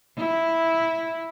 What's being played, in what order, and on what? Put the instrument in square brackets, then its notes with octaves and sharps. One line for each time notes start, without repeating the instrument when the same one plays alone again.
[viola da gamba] E4